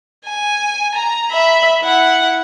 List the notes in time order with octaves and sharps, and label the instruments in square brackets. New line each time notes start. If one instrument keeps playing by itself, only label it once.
[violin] G#5
A#5
E5 B5
E4 F#5